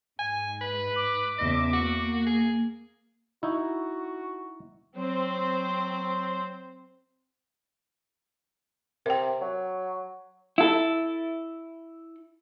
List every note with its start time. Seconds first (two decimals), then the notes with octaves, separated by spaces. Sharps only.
0.19 G#2 G#5
0.61 B4
0.96 D6
1.38 E2 C#3 D#5 E5
1.73 A#3 F#4
2.27 G#4
3.43 D#4 E4 F#4
4.97 F#3 C4 C5
9.06 C3 A#4 G5
9.41 F#3
10.58 E4 A4